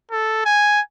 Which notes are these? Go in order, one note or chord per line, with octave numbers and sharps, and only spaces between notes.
A4
G#5